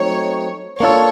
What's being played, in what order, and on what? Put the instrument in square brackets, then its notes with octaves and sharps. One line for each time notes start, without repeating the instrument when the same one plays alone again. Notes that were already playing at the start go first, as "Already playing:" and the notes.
Already playing: [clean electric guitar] F#3 A3 C4 D#4 [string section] C#5
[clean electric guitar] A#3 D4 F4 A4 [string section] C#5